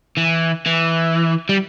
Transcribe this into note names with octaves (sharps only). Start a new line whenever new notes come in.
E3
E3
G3